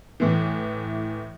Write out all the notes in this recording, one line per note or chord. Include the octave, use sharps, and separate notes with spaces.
A2 E3